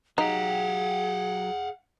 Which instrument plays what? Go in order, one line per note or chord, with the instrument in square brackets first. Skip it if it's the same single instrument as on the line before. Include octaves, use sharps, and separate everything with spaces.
[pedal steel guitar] F#3 G4 [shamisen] D#4 [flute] G#4 [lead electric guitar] F5 F#5